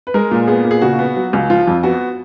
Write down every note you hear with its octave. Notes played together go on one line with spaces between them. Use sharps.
B4
G#3 A#4
A#2
B3 G#4
A#2
G#4
C#3 F#4
B3
F#3
C#2
F3 F4
F2
B3 F#4